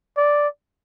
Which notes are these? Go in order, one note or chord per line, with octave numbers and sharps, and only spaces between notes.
D5